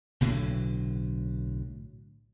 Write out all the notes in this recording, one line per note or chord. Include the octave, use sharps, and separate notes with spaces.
B1 A2 D3 F#3